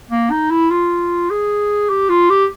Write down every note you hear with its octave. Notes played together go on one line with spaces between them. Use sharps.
A#3
D#4
E4
F4
G#4
G4
F4
G4